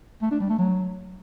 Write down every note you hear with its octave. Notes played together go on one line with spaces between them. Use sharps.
A3
D4
G3
A3
F#3